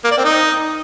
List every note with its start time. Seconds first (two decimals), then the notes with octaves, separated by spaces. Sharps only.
0.05 A#3
0.11 D5
0.18 C4
0.24 D#4